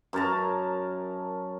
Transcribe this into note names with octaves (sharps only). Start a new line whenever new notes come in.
F#2 A#4 A5 A#5